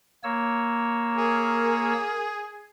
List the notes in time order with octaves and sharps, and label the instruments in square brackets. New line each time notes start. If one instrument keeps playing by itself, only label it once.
[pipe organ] A#3 C#5 E6
[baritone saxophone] G#4 [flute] A#4